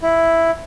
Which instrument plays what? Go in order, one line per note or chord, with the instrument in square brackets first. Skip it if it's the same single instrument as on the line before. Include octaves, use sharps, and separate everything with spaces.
[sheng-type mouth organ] E4